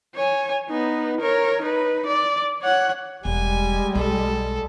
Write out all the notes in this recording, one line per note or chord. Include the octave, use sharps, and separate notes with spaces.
C#5 G#5
B3 D#4
A#4 C#5
D#4 B4
D5
C#5 F#5
E1 G3 G#3 G#5
B1 A4